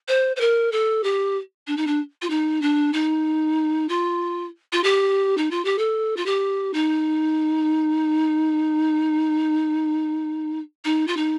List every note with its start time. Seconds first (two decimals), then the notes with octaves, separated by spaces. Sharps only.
0.08 C5
0.36 C5
0.40 A#4
0.72 A4
1.04 G4
1.67 D4
1.77 D#4
1.87 D4
2.22 F4
2.30 D#4
2.62 D4
2.93 D#4
3.89 F4
4.73 F4
4.84 G4
5.37 D#4
5.51 F4
5.65 G4
5.78 A4
6.17 F4
6.26 G4
6.73 D#4
10.85 D#4
11.07 F4
11.17 D#4